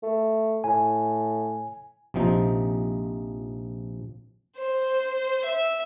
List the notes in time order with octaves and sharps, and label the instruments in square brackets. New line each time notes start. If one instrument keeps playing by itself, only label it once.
[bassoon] A3
[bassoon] A2 [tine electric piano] G#5
[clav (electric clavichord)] A#1 C3 F3 D#4
[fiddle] C5
E5